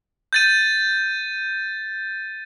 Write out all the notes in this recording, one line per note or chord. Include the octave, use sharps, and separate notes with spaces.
G6 A6 D#7